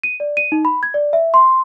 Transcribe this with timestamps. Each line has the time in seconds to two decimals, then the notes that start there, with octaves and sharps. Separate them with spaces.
0.04 D#7
0.20 D5
0.37 D#7
0.52 D#4
0.65 B5
0.83 G#6
0.94 D5
1.13 E5
1.34 C6